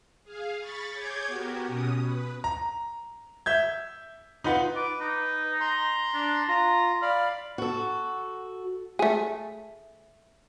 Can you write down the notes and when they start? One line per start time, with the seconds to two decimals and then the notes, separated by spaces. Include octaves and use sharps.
0.24 G#4 F5
0.59 B5 C#6 A6
0.91 G#4 C#5 D6 G6 G#6
1.26 B3 F#4 G4 A#4
1.65 B2 C#4 D#6
1.99 B4
2.44 A#5
3.46 E5 G6 G#6
4.44 D#4 F4 B4 F#5
4.76 B4 D6
5.00 D#4
5.60 A#5 C6
6.14 D4
6.48 F4 A#5
7.02 D5 F5 B5
7.58 F#4 A4
8.99 A3 G#4